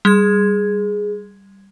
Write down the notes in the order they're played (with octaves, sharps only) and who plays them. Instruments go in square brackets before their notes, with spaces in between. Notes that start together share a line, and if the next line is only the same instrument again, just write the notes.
[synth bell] G3 G#6 [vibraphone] G#4